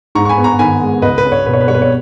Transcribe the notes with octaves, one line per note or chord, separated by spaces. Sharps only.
G#2 A#5 C#6
C#6
G#5 B5
B3
A#5 C#6
D#3 G#5 B5
G#3
C#2 B4 D#5
B4
C#4
C#5
B2 B4
C#5
B4
G3 C#5
B4
C#5